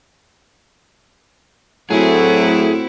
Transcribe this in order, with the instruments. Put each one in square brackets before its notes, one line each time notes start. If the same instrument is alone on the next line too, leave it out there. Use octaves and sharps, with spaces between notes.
[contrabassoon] A2 [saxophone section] F#3 A3 [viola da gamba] C4 E4 F#4 [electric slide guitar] G#4